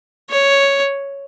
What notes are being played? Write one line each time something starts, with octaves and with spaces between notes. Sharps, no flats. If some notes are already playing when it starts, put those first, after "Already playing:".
C#5